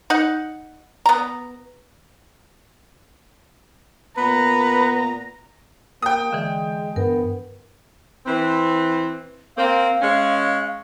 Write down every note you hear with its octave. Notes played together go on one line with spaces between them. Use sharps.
D#4 F#5
B3 A#5
A#2 B3 B4 A#5
A#3 G5 D#6
D3 E3 G#3
G2 B3 A#4
E3 C4
A#3 C4 F5
G#3 C#4